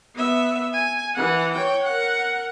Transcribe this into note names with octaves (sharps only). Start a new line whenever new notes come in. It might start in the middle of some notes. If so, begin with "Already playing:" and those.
B3 E5
G#5
E3 F#5
C#5 G5
A#4 F#5